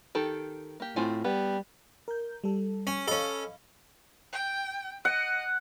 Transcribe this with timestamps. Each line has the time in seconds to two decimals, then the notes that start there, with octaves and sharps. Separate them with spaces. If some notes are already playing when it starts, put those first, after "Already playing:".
0.15 D#3 G4 A4
0.80 A#3 G4
0.96 A2 C4 F4 G#5
1.24 G3 B3
2.08 A#4 G6
2.44 G3 A4
2.87 C#4
3.08 C#4 A4 D#5 F5 B5
4.32 G5
5.05 D#5 F#5